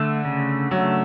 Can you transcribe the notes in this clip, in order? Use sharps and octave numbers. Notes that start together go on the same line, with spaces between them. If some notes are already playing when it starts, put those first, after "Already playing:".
Already playing: D3 A3
C#3
F#3 A3